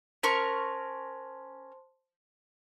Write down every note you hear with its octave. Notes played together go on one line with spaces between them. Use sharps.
C#4 A#4 C5 A5 C6 C#6